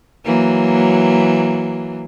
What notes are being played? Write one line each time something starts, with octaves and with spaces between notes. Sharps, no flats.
E3 F#3 A#3